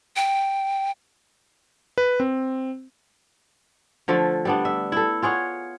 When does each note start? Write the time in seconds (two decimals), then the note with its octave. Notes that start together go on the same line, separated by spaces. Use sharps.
0.16 G5
1.98 B4
2.20 C4
4.08 D3 F3 A3
4.45 G3 B3 D4
4.65 E5
4.92 E4 A4
5.22 F4 G#4 C#5 F#5